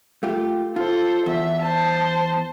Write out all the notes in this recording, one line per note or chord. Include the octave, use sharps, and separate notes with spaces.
A3 F4 G4
F4 A4 C5
E2 E5
C5 A5